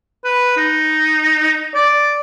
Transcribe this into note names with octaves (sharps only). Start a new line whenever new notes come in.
B4
D#4
D5